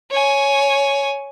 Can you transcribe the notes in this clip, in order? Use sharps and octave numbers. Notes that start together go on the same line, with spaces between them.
C#5 G#5